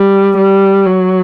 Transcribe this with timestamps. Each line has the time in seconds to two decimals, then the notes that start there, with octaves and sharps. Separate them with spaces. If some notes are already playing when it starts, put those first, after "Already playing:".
Already playing: G3
0.37 G3
0.86 F#3